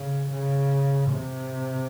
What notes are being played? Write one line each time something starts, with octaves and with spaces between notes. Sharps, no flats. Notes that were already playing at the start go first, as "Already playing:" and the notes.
Already playing: C#3
C#3
C3